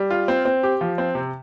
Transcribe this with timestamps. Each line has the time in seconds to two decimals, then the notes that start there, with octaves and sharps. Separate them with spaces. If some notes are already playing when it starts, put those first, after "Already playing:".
Already playing: G3
0.10 F4
0.28 C4
0.45 C4
0.63 G4
0.81 F3
0.98 C4
1.15 C3